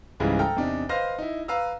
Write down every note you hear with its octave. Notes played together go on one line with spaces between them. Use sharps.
C#2 G#2 C#3 E3 G3
A4 G5 A#5 F6
E2 C3 D4 D#4
B4 C5 D#5 F5 F6 A#6
D#4 E4
B4 F5 A#5 E6